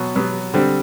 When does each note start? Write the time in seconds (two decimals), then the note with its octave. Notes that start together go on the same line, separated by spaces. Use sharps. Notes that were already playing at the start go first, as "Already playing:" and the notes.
Already playing: B2 F#3 B3
0.15 B2 F#3 B3
0.54 D3 G3 C4